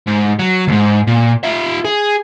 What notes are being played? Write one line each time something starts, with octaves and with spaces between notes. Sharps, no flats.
G#2
F#3
D2 G#2
A#2
F4 E5
G#4